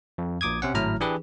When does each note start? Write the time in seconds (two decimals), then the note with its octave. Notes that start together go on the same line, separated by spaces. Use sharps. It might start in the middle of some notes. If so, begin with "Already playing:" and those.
0.18 F2
0.41 A#1 A#2 D6 D#6 G#6
0.62 C3 C#4 F#5
0.74 G#1 A2 F#3 E4 A#5 F6
1.00 E3 D4 G4 G#4 B4